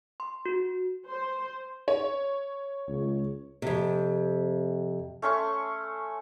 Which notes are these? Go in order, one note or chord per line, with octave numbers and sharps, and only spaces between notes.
C6
F#4
C5
C#5
C#2
F2 C3
A3 C#4 C6 C#6